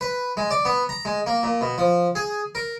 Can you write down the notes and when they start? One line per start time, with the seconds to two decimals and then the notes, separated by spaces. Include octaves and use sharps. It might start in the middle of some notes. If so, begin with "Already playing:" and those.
0.01 B4
0.37 G#3
0.50 D5
0.65 B3
0.89 A#5
1.05 G#3
1.26 A#3
1.43 A#2
1.61 B2
1.78 F3
2.15 G#4
2.55 A#4